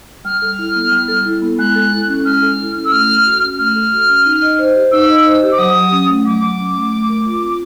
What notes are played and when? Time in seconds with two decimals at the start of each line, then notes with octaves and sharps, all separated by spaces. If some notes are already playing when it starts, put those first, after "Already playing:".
0.25 G3 F6
0.42 A4
0.59 E4
0.75 B3
0.92 G3
1.08 A4
1.25 E4
1.42 B3
1.59 G#3 F#6
1.75 A4
1.92 E4
2.08 C#4
2.25 G#3 F6
2.42 A4
2.59 E4
2.75 C#4
2.85 E6
2.92 A3 F6
3.08 A4
3.26 F#4
3.42 C#4
3.59 A3 F6
3.75 A4
3.92 F#4
4.09 C#4
4.25 D#4
4.42 D#5
4.59 C5
4.75 G4
4.92 D#4 E6
5.09 D#5
5.26 C5
5.43 G4
5.52 D6
5.58 F#3 D#6
5.75 F#3
5.92 C#4
6.09 A3
6.25 F#3 D6
6.42 F#3
6.59 C#4
6.75 A3
6.91 A3
7.09 A#4
7.25 F4
7.42 C4